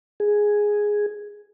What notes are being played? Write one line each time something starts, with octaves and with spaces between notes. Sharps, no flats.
G#4